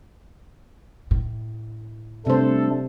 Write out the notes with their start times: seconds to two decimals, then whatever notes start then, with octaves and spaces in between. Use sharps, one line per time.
1.11 A2
2.27 C3 G3 A3 D4 A4 C5